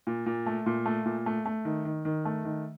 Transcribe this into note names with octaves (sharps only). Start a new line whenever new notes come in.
A#2
A#2
A3
A#2
A3
A#2
A3
A3
D#3
D#3
D#3
A3
D#3